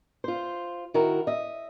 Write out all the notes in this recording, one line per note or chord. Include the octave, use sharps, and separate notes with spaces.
F4 C5
D#3 E4 F#4 A#4
D#5 E5